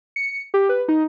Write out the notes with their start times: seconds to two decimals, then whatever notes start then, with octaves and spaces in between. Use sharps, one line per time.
0.16 C#7
0.54 G4
0.69 B4
0.88 D#4